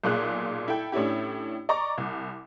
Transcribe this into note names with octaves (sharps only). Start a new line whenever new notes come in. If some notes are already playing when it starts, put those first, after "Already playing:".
B1 A#2 G#4 F#6
E4 A4 G5
A2 C#4 D4 E4 G4
D5 D#5 A#5 C#6 D6
C2